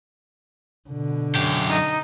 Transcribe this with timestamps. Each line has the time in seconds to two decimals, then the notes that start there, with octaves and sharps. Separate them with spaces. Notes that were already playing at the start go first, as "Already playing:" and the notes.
0.89 B2 D3
1.35 F#2 G4
1.70 D#4